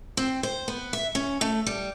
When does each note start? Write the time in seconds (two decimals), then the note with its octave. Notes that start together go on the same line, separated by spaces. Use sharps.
0.17 C4
0.43 C5
0.68 B3
0.93 E5
1.15 C#4
1.41 A3
1.66 G3